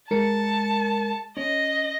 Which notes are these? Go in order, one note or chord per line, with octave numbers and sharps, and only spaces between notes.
G#3 A#4 A5 C#7
C#4 D#5